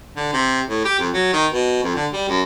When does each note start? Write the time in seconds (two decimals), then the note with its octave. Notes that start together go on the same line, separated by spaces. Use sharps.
0.16 D3
0.33 C3
0.68 A2
0.85 G4
0.99 F2
1.13 F#3
1.33 D#3
1.51 B2
1.83 F2
1.95 D3
2.13 G3
2.28 F#2